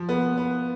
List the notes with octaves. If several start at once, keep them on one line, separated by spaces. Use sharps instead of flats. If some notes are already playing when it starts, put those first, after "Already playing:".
Already playing: F3
B3
B3